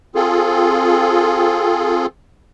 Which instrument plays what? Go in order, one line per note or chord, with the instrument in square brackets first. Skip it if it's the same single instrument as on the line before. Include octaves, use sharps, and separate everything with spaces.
[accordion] C4 F4 G#4 A4